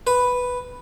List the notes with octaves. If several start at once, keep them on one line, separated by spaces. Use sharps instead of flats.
B4